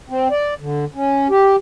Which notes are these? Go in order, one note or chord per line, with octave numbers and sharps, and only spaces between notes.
C4
D5
D3
C#4
G4